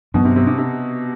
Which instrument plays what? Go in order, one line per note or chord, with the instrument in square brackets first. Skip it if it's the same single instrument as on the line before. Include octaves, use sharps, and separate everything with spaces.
[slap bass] G2 F#3 B3 [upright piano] B2
[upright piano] C3
C3
C3
C3